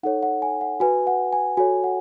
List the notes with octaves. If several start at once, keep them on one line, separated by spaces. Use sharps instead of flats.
D#4 A4 C#5 F#5
F#5
G#5
F#5
F#4 B4 G#5
F#5
G#5
F#4 A4 C#5 G#5
F#5